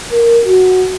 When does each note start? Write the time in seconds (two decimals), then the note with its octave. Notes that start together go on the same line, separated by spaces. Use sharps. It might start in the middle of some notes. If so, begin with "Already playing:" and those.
0.11 A#4
0.45 F#4